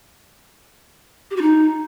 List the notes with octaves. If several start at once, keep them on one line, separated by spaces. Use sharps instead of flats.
G4
F#4
D#4